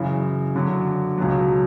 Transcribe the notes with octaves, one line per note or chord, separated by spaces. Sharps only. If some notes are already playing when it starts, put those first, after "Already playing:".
Already playing: F#2 C#3 E3
F#2 D3 F#3
C#2 B2 F#3